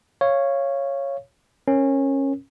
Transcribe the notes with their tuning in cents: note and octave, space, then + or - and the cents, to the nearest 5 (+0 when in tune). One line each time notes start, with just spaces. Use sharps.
C#5 -5 F5 -20
C#4 -20 A#4 +0